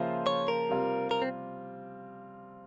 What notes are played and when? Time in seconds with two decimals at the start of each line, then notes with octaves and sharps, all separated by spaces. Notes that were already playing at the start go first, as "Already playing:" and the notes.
Already playing: C#3 F3 A#3 F4 C5 E5
0.27 C#5
0.48 A#4
0.69 C3 G3 C4 F4
1.11 A#4
1.22 C4